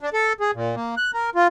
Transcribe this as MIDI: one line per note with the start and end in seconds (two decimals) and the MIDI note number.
0.01 0.10 62
0.13 0.33 69
0.40 0.51 68
0.54 0.75 46
0.76 0.95 58
0.97 1.11 90
1.14 1.30 70
1.35 1.47 65